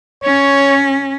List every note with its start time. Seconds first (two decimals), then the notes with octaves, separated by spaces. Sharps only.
0.24 C#4 C#5